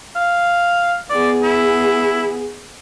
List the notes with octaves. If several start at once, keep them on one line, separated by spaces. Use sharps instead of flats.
F5
B3 G#4 D5
E4